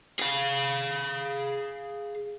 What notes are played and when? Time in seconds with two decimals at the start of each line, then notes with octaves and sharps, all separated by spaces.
0.19 G#4 F5